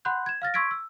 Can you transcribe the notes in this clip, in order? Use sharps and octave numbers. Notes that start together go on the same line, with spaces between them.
F#5 B5 C6 F#6 G6
G#6 E7
F5 F6 A6 A#6
C6 C#6 E6 G#6 B6 D7
E6